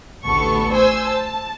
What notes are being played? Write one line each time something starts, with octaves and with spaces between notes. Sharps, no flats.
A1 D2 B3 A4 C#6
C5 G#5 E6
A5